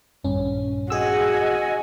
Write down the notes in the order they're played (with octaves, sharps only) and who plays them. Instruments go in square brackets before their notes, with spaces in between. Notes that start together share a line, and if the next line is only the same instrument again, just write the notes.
[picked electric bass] A#1 G2 [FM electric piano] C#4
[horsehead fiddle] F#4 [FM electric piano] G#4 E6 [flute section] D#5 G#5